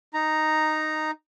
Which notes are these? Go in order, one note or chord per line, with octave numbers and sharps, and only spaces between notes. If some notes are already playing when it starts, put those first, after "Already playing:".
D#4 A#5